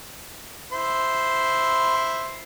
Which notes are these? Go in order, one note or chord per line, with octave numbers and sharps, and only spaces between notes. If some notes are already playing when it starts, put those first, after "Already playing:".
E4 C5